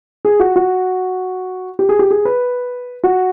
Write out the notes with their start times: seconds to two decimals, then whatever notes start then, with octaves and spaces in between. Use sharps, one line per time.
0.25 G#4
0.40 F#4
0.56 F#4
1.79 G4
1.89 G#4
1.99 G4
2.11 G#4
2.25 B4
3.04 F#4